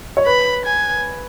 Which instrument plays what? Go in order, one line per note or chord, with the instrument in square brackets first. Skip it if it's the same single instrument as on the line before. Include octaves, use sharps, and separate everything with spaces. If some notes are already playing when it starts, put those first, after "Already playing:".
[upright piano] C#5
[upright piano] B4 [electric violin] B5
[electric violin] G#5